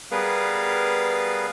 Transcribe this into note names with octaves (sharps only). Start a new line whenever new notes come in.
G3 B3 G#4 A#4 B4 F5